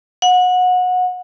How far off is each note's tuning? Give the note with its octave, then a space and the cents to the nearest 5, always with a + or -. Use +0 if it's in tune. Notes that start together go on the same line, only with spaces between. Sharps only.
F#5 -25